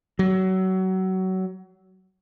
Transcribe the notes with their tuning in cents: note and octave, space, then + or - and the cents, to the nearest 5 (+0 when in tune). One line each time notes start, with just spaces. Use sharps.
F#3 +25